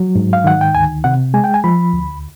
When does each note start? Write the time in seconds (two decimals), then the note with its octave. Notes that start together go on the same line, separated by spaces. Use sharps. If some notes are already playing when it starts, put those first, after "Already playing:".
Already playing: F#3
0.15 G#2
0.33 F5
0.44 D#3 F#5
0.61 G5
0.75 D2 G#5
1.04 C3 F#5
1.34 G#3 G#5
1.44 G5
1.54 G#5
1.64 F3 B5
1.94 D2